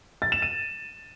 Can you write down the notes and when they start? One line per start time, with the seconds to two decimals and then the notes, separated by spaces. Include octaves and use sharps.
0.22 A6
0.32 E7
0.42 D#7